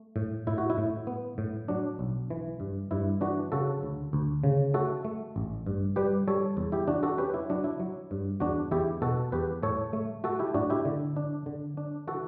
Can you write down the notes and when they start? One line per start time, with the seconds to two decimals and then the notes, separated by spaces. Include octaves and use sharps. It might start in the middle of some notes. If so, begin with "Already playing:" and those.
Already playing: A3
0.16 A2
0.47 A2 E4
0.58 F#4
0.70 E4
0.78 A2
1.07 B3
1.38 A2
1.68 F#3 D4
1.99 B1
2.30 E3
2.60 G2
2.91 G2 E4
3.21 E3 D4 F#4
3.52 C#3 F#4 A4
3.83 D2
4.13 D2
4.44 C#3
4.74 A3 F#4 A4
5.05 A3
5.36 A1
5.66 G2
5.96 G3 G4 B4
6.28 G3 A4 C#5
6.57 E2
6.72 E4 G4
6.88 E2 D4 F#4
7.03 F#4 A4
7.18 C#4 G4 B4
7.34 E4
7.50 F#3 D4
7.64 E4
7.80 F#3
8.11 G2
8.40 E2 D4 F#4
8.71 E2 E4 G4
9.02 B2 F#4 A4
9.32 E2 G4 B4
9.63 A2 A4 C#5
9.93 A3
10.24 A3 F#4 A4
10.39 E4 G4
10.54 A2 D4 F#4
10.70 E4 G4
10.85 D3
11.16 D4
11.46 D3
11.77 D4
12.07 E3 F#4 A4